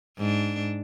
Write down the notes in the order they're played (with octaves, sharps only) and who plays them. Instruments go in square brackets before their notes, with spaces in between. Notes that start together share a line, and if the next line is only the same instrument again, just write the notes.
[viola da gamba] G#2 D4